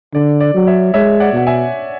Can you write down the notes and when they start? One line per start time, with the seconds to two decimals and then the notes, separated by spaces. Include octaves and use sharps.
0.14 D3 D5
0.40 D5
0.54 F#3
0.67 C#5 E5
0.94 G#3 C#5 E5
1.20 D5 F#5
1.33 B2 F#5
1.47 E5 G#5